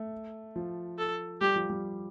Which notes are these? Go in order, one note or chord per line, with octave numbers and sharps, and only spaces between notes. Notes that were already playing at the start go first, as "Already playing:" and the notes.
Already playing: A3
F3
A4
G3 G4
F3
G3